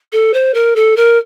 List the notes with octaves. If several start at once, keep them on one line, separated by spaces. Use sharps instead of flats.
A4
C5
A#4
A4
A#4